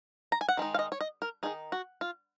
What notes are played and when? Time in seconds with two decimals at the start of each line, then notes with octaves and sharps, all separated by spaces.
0.32 A#5
0.41 G#5
0.49 F#5
0.57 D#3 G#3 D#4
0.74 F5
0.79 D#5
0.92 C#5
1.01 D#5
1.22 A#4
1.43 D#3 G#3 D#4 G#4
1.72 F#4
2.01 F4